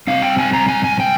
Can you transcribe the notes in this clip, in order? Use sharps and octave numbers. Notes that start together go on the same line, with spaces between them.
C3 G3 C4 F5
G5
G#5
A#5
G#5
G#5
G5